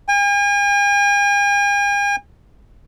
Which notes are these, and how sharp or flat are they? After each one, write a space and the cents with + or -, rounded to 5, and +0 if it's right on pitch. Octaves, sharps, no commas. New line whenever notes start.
G#5 -45